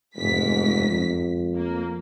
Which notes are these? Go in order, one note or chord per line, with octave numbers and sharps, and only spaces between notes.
F1 E2 G#2 B6
F2
A#3